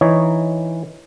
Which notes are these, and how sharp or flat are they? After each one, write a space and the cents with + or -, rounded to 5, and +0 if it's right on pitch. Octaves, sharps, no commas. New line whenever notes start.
E3 +0 D#4 +0 C#5 +0